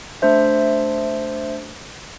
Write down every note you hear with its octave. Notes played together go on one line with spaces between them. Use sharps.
A3 D4 C5 E5